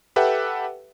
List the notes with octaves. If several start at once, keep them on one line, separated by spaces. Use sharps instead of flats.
G4 A4 B4 E5 F#5 G5